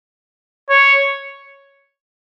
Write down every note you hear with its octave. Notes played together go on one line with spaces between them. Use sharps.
C#5